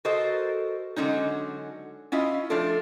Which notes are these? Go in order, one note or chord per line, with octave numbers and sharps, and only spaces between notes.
F#4 A4 A#4 C5 D#5
D3 F#3 G#3 C#4 D#4
C#4 E4 F4 D#5
F3 A3 D4 F4 A4